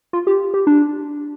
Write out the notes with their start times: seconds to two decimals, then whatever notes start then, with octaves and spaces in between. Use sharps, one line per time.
0.13 F4
0.27 G4
0.54 G4
0.67 D4